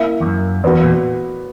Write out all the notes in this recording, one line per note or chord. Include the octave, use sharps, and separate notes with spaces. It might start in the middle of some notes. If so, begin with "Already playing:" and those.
Already playing: A#3 E4 A#4 E5
E2
F#2
E2 B3 F#4 B4 D5
A#2